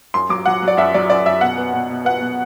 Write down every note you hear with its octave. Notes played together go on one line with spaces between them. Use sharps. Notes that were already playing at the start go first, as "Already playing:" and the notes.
F#2 C6
F#3 D6
F#3 F#5
F#3
D5
F#2 E5
F#3 D5
F#2 D5
F#2 E5
B2 F#5
B3
B2
B2
B3 F#5
B2